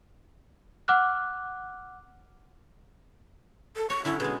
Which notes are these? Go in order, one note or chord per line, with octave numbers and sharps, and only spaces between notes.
F#5 D6 F6 F#6
A4
C#5 C#6
D3 F#3 C#4 E4
B2 G#3 G#4